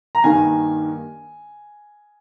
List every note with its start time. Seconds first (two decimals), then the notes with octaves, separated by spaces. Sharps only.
0.15 A#5
0.23 G2 D#3 A#3 G#5